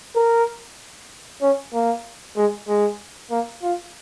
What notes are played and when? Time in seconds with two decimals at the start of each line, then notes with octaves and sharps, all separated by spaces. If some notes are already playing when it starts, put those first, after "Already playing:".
0.16 A#4
1.42 C#4
1.73 A#3
2.37 G#3
2.68 G#3
3.31 A#3
3.63 F4